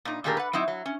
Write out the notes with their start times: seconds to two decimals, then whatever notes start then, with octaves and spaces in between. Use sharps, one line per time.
0.05 A#2 D#4
0.24 A#2 D#3 A3 G4 G#4 A#4
0.37 B4 F#5
0.53 F#3 C4 D#4 E4
0.68 F#3
0.86 C#4